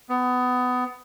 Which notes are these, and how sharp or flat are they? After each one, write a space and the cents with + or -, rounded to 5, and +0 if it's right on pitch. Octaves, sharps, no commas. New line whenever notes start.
B3 +20